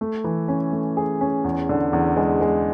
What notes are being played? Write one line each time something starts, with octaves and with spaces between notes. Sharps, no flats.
A3
E3
C#4
A3
G#4
C#4
E2
D3
E2
G#3
G#3